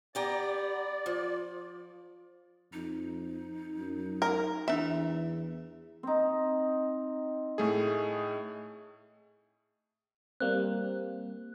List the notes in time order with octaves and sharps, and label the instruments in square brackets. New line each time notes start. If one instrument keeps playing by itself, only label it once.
[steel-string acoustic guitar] B3 G4 A#5 [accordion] D5
[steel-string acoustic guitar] F3
[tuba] F2 [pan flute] D#4
[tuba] F#2
[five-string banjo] A#4
[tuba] E2 [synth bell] B3 D4 [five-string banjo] E5
[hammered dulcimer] C4 D#4
[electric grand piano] A2 A3 G#4
[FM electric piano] G3 A#3 C4 [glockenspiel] F#6